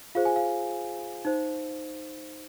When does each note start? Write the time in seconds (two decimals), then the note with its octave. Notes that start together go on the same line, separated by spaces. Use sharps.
0.15 F4 G#4 C5 F5
0.25 G#5
0.36 F5
1.25 D#4 C5